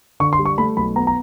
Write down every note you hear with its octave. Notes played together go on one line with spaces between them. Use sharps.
D3 C#6
C6
G3
C#6
A3 B5
B1 B5
B3 A#5
A#5